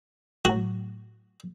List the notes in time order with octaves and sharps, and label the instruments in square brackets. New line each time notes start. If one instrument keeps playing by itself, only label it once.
[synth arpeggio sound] A2 F#3 [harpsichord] F#4